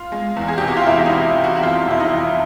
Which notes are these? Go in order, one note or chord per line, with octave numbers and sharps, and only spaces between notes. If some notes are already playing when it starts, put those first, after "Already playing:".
Already playing: F4
G#3
E2
G#4
C3 G4
F#4
F4
E2 E4
D#4
C3
E2
F#4
F#4
F2 F4
C3 E4
D#4
F2